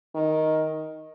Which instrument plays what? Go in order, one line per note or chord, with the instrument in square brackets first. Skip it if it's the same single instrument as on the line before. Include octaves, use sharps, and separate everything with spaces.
[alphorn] D#3